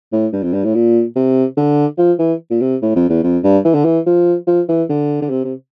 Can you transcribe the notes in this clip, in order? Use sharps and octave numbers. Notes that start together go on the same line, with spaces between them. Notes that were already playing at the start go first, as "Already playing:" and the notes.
A2
G2
F2
G2
A2
A#2
C3
D3
F3
E3
A#2
C3
A2
F2
E2
F2
G2
E3
D3
E3
F3
F3
E3
D3
D3
C3
C3